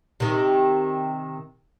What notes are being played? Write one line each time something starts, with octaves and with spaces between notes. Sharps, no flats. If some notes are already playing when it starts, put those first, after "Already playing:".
C3 D#3